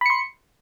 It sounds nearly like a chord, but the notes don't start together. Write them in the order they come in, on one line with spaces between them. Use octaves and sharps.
B5 C#7 C6